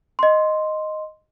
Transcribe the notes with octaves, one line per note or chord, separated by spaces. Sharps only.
D#5 C6